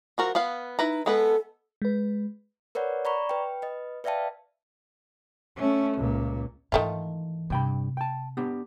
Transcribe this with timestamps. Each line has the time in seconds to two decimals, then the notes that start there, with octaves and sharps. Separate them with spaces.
0.18 F3 F#4 A#4
0.35 B3 B4 F5
0.79 D#4 E4 B4 A#5
1.06 G#3 B3 A4 B4
1.82 G#3 B4
2.75 A#4 B4 C#5 D5 F#5
3.05 D5 A#5 B5 C#6
3.29 B4 G5
3.62 B4 D#5
4.04 B4 D5 E5 F5 G5 A5
5.57 A3 C#4
5.97 C#2 A#2
6.72 G#2 D#3 E3 A3 F4
7.50 G2 C3 G5 B5
7.97 G5 A5
8.37 B3 D4 G4